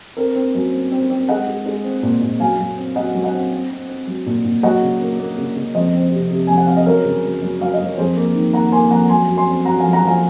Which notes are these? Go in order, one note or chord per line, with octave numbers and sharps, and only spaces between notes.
C4 A#4
C4
F#2
C4
C4
C4
G#3 D#5 F#5
G#3
G#3
C4
A#2
A#2
F#2 F5 G#5
F#2
C4
F#2 D#5 F#5
F#3
D#5 F#5
C4
C4
C4
C4
F#3
A#2
A#2
F#3 D#5 F#5
C#3
A#3
A#3
C#3
C#3
F2 C5 D#5
C4
C3
C3
F2 G#5
F#5
C4 F5
D#5
F#2 A#4 C#5
C#3
F#2
F#2
F#2 F5
D#5
F#2
C#5
F2 G#4 C5
A#3
D#3
A#3 F#5 A#5
A#3 G#5 C6
F2 F#5 A#5
F#2 G#5 C6
F#2
G#5 C6
C4
F#2 F#5 A#5
F3 F5 G#5
F#5 A#5
F3 F5 G#5